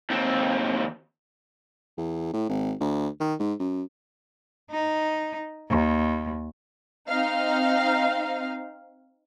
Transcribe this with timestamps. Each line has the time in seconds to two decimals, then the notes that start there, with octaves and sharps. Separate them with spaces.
0.10 D#2 C4
1.97 E2
2.33 A2
2.49 G#1
2.80 D2
3.20 D#3
3.39 G#2
3.59 F#2
4.71 D#4
5.69 D#2
7.08 C4 D#4 F5